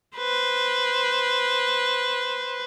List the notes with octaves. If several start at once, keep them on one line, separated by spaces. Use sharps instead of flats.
B4 C5